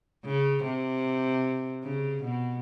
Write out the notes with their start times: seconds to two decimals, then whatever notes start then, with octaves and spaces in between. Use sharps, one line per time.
0.25 C#3
0.64 C3
1.83 C#3
2.23 B2